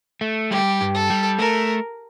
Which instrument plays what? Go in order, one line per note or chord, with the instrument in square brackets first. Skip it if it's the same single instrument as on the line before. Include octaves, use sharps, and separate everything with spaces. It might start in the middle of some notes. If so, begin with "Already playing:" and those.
[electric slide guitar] A3
[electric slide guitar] G3 [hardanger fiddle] G4
[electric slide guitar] G2
[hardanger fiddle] A4
[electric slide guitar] G3
[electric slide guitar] A3 [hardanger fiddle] A#4